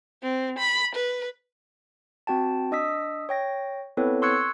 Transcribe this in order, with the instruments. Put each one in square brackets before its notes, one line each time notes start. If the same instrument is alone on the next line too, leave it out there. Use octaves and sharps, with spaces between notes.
[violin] C4
B5
B4
[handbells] C4 F#4 G5 A5
D4 D#5 D#6 E6 B6
C#5 G5 A#6
B3 C4 E4 A4 B4 C#5
C6 C#6 E6 F#6 G#6 C#7